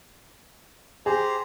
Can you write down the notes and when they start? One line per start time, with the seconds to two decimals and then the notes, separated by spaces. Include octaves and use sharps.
1.06 G4 G#4 C5 A#5